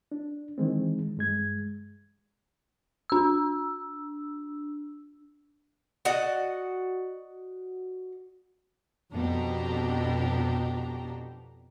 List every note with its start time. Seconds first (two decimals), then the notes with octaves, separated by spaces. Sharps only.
0.12 D4
0.58 D#3 E3 G#3 C4
1.17 G2 G#3 G#6
3.10 D4 E6
6.05 F#4 D5 D#5 F#5
9.13 F2 B2 D4 G4 A#5